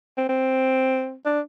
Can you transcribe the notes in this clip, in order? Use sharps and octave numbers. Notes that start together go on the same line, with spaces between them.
C4
C4
D4